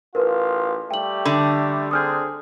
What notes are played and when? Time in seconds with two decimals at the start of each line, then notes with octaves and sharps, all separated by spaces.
0.15 A1 F4 A#4 B4
0.91 G3 A3 G5 F#7
1.25 D3
1.91 C4 D4 G#4 D#6 F6 G6